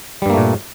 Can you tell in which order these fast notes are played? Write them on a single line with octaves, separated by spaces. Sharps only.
G3 G2 A#3 A3 A#2